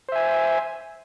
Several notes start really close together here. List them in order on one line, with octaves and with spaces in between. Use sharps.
C5 E5 G#5